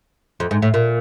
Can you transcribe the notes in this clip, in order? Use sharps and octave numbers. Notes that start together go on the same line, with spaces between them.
F2
G#2
A2
A#2